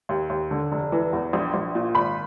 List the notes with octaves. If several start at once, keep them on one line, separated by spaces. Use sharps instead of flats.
D#2
D#2
D3
F1
E3
E2
A#1
A#1
A#2
G#1 B5